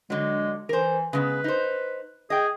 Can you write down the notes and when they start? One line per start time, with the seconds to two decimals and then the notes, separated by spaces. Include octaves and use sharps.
0.10 D3 F#3 G#3
0.69 E3 A#4 C5
1.13 C#3 G#3 B3 B4
1.44 D#4 C5
2.30 G#4 D#5 G5